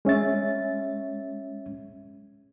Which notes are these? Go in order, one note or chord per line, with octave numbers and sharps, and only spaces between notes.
G#3 C#4 E5 A6